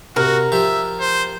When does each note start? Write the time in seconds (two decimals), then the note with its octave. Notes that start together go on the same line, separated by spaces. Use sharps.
0.16 C3 F#4 A#4
0.52 F3 G4 E5
1.00 C5